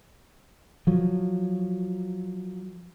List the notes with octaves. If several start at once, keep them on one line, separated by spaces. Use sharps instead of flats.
F3 F#3